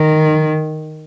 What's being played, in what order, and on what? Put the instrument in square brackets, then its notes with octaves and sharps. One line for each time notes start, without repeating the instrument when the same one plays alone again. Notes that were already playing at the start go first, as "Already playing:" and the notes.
Already playing: [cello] D#3